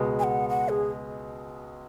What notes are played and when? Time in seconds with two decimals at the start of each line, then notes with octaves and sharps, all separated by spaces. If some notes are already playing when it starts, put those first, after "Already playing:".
Already playing: C#2 B2 G#3 B3
0.19 G#5
0.24 F#5
0.49 F#5
0.69 G#4